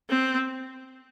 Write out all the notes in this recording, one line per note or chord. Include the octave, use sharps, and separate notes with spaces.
C4